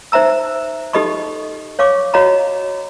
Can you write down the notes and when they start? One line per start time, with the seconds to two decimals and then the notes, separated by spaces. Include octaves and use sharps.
0.12 D#4 C5 E5 A#5 E6
0.93 D#4 G4 A4 D#5 B5 C#6
1.79 C#5 F5 C#6 D6
2.14 F#4 C#5 D#5 F5 A#5 B5